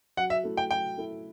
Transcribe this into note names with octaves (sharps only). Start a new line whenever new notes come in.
F#3 F#5
E5
A3 E4 A4
G5
F#3 G5
A3 E4 A4